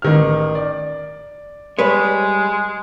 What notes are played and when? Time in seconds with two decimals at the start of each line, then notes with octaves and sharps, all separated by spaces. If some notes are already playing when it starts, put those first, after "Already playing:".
0.02 A1 D#3 F6
0.55 D5
1.79 G3 G#3 B4 C#5